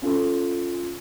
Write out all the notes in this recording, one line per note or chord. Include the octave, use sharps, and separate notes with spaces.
C#4 F4 A4